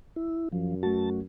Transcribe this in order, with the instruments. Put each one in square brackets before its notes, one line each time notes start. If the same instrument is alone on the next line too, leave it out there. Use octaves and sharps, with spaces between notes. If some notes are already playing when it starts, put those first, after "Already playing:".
[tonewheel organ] E4
[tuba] F#2 [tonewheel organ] F3
[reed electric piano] A3 F#4 [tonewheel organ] A5